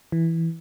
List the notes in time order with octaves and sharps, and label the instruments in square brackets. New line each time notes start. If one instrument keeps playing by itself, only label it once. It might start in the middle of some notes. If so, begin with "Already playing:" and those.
[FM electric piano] E3